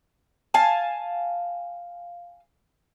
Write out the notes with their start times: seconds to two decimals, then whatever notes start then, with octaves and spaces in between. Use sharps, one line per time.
0.54 F5 G#5 A5